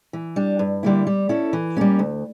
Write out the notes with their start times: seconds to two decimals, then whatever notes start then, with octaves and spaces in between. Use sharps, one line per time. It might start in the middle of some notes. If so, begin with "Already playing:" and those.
0.13 E3
0.36 G3 D4
0.59 G2
0.83 D3 G3 A#3 E4
1.07 G3
1.29 C#4 E4 A4
1.53 E3
1.77 G3 A#3 C#4
1.99 D2